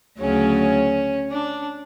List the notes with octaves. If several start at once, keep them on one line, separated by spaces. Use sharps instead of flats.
D2 C#3 F#3 C#4
D4